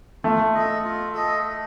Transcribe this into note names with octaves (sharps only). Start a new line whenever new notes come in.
A3 F4
A4 D#5
F4
A4 D#5